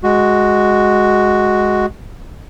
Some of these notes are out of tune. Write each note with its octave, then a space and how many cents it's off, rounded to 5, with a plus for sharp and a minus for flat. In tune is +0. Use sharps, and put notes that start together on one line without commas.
G#3 +0 F#4 +0